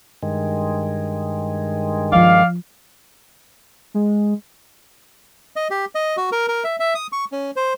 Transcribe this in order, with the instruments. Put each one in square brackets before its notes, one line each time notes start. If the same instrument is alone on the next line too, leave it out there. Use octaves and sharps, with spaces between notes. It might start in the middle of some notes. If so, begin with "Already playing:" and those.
[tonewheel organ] G2 D#3 G#3
[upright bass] F3 F4 [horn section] D5 F5
[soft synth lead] G#3
[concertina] D#5
G4
D#5
F#4
A#4
A#4
E5
E5
D#6
C#6
C#4
C5